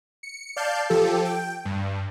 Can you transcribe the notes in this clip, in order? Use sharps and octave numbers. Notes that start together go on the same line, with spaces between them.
C#7
D5 F5 A5 G6 C7
F3 G4 A4
G5
G2